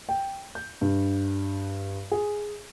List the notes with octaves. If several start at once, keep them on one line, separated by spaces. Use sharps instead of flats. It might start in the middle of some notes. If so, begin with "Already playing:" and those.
G5
G6
G2
G#4